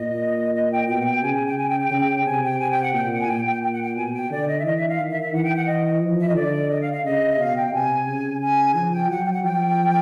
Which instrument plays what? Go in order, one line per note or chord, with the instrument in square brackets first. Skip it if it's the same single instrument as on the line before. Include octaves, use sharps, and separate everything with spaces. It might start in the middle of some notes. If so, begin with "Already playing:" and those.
Already playing: [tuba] A#2 [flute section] D#5
[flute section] D#5
G5
[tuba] B2 [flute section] G5
[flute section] F#5
G5
[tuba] C#3 [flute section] G#5
[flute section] G#5
G5
G#5
G5
G5
[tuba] C#3
[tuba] C3 [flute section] G#5
[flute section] G5
G#5
G5
F#5
[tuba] A#2 [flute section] G5
[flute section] F#5
G#5
[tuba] A#2 [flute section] G5
[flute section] G5
G5
F#5
G5
[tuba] B2 [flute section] G#5
[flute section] G5
[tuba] D3 [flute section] D5
[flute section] D#5
E5
[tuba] E3 [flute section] D#5
[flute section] E5
F5
[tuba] D#3
[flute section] E5
E5
[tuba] E3 [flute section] F#5
[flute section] G5
F#5
D#5
[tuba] F3
[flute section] E5
D#5
[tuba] D3 [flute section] D5
[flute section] D#5
F5
F5
[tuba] C#3 [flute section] D#5
[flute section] E5
[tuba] B2 [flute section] F5
[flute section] G5
[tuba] C3 [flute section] G#5
[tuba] C#3
[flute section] G#5
[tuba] F3 [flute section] G#5
[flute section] G5
[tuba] F#3 [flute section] F#5
[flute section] G5
F#5
[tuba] F3 [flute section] G5